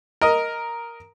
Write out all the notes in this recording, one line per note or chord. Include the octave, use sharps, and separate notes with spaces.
A#4 D#5